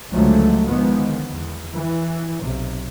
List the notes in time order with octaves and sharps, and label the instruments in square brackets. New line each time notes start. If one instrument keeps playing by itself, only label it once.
[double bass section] C#2 D3 F3 F#3 G#3 A3
D3 D#3 F3 G#3 B3
E2
E3
B1 C3